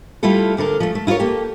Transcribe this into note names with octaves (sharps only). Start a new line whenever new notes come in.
G3 A3 E4 F4 A4
D2 D3 A4 A#4
F3 A3
A3
E4 F4 A4 A#4 C#5
A#3 G4 A4